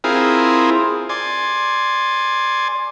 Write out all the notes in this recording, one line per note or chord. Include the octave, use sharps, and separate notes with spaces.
C4 E4 F4 G#4 A#4
D5 G#5 C6